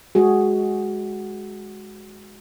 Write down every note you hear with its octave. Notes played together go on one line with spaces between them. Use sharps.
G#3 F#4 G#4